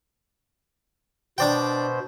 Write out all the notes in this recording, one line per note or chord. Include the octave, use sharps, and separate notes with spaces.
B2 D4 C5 D5 G5